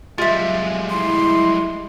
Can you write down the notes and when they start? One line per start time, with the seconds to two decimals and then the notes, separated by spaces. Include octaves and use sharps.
0.18 G3 G#3 F4 E5
0.90 E4 C6